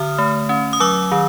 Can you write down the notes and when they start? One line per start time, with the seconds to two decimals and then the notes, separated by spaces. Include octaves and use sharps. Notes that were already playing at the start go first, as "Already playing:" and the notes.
Already playing: D3 D#6 F6
0.19 A3
0.49 C#4
0.73 D#6
0.80 F#3 D6 E6
1.12 D#3